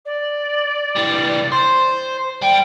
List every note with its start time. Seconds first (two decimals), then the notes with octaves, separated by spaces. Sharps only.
0.05 D5
0.96 E3 G3
1.52 C5
2.42 G3 G5